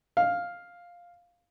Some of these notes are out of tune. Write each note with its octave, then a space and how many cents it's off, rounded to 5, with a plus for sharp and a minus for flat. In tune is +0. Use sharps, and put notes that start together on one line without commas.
F5 +5